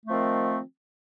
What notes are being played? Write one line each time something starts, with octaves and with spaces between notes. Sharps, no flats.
D#3 F3 A3 C4